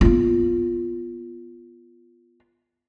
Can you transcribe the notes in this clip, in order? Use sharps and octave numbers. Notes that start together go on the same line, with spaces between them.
B3 F4